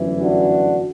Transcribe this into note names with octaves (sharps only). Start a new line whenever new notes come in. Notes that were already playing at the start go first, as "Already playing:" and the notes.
Already playing: G1 F#2 E3 A3
D4 F#4